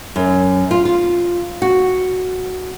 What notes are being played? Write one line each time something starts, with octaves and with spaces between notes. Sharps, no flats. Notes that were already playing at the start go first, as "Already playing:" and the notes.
F#2
F4
F4
F#4